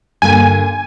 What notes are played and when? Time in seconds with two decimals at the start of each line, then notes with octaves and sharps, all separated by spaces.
0.22 G2 D3 A#3 G#5